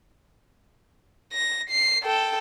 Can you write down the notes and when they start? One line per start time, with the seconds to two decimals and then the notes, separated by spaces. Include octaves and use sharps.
1.33 A#6
1.70 C7
2.03 A4 G5